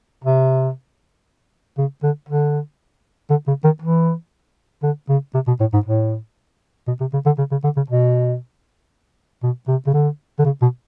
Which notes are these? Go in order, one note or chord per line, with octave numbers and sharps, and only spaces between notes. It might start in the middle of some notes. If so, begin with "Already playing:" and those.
C3
C#3
D3
D3
D3
C#3
D#3
E3
D3
C#3
C3
B2
A2
G#2
A2
B2
C3
C#3
D3
C#3
C#3
D3
C#3
B2
B2
C3
C#3
D3
D3
C#3
B2